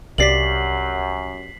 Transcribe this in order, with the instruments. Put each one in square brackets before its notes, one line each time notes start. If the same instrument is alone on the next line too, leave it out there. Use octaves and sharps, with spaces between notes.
[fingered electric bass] C2 [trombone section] F#2 [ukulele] G4 D5 F5 [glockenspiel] B6 C7 F#7